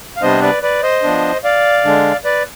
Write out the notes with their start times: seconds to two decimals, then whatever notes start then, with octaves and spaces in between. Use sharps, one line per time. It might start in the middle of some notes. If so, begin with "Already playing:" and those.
0.17 F5
0.22 C3 G3 B3 D4 C5 D#5
0.42 B4 D5
0.62 B4 D5
0.83 C5 D#5
1.03 F3 B3 D4
1.44 D5 F5
1.84 D3 G#3 D4
2.24 B4 D5